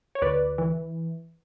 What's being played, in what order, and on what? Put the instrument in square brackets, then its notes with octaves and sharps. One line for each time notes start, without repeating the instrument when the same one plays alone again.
[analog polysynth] C#5
D2 B4 D5
E3